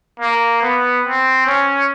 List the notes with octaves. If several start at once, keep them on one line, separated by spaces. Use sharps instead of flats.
A#3
B3
C4
C#4